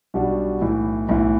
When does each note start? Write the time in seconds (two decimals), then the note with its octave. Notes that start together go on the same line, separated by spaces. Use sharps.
0.14 B1 B2 G3 D4 F#4
0.61 B1 A2 E3
1.09 B1 A2 E3